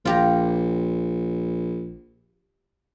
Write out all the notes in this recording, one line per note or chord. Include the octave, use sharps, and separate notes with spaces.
A#1 F4 G4 A#5